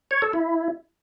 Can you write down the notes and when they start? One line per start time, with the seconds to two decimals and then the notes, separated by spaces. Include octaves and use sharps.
0.11 C#5
0.22 A4
0.33 E4